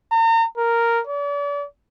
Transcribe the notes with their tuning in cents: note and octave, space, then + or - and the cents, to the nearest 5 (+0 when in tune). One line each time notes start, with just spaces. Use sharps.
A#5 -40
A#4 -5
D5 -40